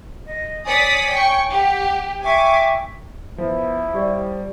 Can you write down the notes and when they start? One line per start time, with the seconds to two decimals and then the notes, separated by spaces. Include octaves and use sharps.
0.23 D#5
0.66 C#5 D5 G#5 D#6 B6
1.11 G5 C#6
1.49 G4 F#5
2.21 E5 G5 G#5 C#6 D6
3.38 F3 B3 E4
3.95 G3 G4 D5